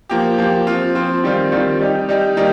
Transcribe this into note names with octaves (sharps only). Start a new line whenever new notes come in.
F3 A#3 G4
F3 A#3 G4
F3 C4 F4
F3 C4 F4
D#3 G3 C4 F4
D#3 G3 C4 F4
G3 D#4 G4
G3 D#4 G4
D#3 G3 A#3 D#4 G4